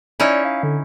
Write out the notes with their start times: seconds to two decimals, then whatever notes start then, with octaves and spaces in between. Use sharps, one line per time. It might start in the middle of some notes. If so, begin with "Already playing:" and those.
0.20 C#4 D#4 E4 D5
0.45 F5
0.63 D3